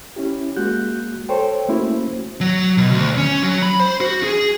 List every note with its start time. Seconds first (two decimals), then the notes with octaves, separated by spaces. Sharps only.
0.16 C#4 E4 G4
0.56 G#3 A#3 F#4 F#6 G6
1.29 A4 C5 C#5 G5
1.68 A3 A#3 C#4 E4 F#4 C5
2.41 F#3
2.78 B2
2.92 D2
3.18 C#4
3.43 F#3
3.62 B5
3.80 C5
4.01 F#4
4.23 G#4